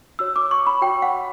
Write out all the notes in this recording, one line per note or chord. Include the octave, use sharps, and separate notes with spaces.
F#4 C#5 E6
D6
C#6
B5
F#4 C#5 G5
F#5